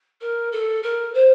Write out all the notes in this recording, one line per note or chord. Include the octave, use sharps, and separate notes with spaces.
A#4
A4
A#4
C5